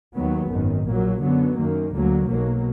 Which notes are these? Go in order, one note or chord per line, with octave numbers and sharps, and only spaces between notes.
D#2 D#3 F#3 B3
G#1 F#2 D#3
A#1 A#2 F#3 A#3
F#2 D3 F#3 B3
F#2 D#3 A#3
D2 D3 F#3 A#3
B1 B2 F#3 A#3